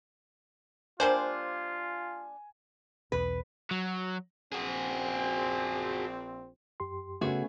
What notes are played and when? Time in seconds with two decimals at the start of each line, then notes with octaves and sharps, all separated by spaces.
1.00 G3 A#3 D4 F4 C5 G#5
3.12 B1 E2 B2 B4
3.71 F#3
4.53 A#1 C4 F#4 G#4
6.80 F#2 G4 C6
7.21 C#3 A3 B3 C#4 F#4 G#4